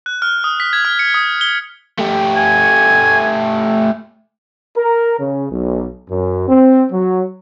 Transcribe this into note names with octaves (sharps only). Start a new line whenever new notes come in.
F#6
F6
D#6
B6
G#6
F6
C#7
D#6
G7
A3 G4
G#5
A#4
C#3
B1
F#2
C4
F#3